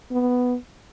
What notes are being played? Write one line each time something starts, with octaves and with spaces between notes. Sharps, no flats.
B3